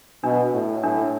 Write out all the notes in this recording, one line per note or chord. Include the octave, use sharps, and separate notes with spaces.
B2 D4
A2
A2 D4